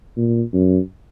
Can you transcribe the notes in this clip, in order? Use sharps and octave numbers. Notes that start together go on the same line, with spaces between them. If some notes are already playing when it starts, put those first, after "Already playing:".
A#2
F#2